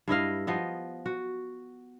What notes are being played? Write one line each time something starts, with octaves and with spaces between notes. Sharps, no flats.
G2 E4 D#5 F5
F3 B3 D#5
F#4